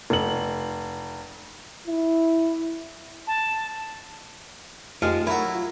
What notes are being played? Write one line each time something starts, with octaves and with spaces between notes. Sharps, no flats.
F1 F#7
E4
A5
F2 F3 G#3 A3 D#4 G4
F#3 E4 F#4 A#4 A#5
F4